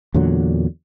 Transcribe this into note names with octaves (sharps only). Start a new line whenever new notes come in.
E2 A#2 D3 F#3